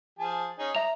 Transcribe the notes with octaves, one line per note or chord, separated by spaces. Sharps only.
F3 G#4 A5
C#4 D#4 G#4
E5 A#5 F7